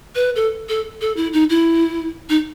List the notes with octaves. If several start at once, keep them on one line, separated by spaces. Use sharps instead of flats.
B4
A4
A4
A4
E4
D#4
E4
D#4